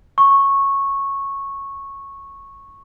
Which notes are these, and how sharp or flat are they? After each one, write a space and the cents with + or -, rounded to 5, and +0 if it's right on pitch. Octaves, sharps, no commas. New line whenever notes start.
C#6 -10